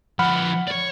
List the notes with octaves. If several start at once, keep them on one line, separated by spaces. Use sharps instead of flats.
F3 B4 F#5 B5 F6
C#5 D5